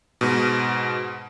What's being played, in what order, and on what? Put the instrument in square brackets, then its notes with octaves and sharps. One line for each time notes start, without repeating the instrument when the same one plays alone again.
[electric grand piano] G#2 B2